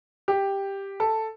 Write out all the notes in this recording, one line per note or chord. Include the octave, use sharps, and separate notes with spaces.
G4
A4